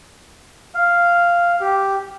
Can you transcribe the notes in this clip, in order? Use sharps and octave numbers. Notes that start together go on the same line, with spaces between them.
F5
G4